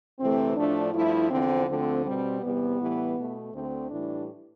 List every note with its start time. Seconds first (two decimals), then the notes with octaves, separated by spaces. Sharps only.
0.19 D2 C3 E3 A3 C4
0.56 A2 F3 A3 D4
0.93 G2 F3 A3 E4
1.31 E2 D3 F3 C4
1.68 D2 D3 F3 A3 C4
2.05 B2 G3 C4
2.41 E2 C3 G3 B3
2.80 A2 E3 G3
3.16 B2 A3
3.53 D2 D3 A3 C4
3.90 A2 E3 G3 D4